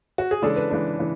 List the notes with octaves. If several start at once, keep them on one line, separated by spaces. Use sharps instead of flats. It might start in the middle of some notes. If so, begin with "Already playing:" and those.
F#4
G#4
C#3 E3 G#3 D4 A4
B4
C#3 E3 G#3 D4
C#3 E3